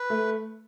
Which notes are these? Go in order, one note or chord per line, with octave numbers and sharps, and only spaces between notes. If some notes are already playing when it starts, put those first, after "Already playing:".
Already playing: B4
A3